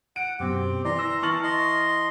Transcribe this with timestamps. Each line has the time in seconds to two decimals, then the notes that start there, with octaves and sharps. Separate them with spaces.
0.16 F#5 D7
0.40 F#2 B2 C4 G4
0.85 E3 D5 A#5 C6
0.99 E6 A#6
1.23 E3 A5 C#6 F6 A6 F#7
1.44 D#5 C6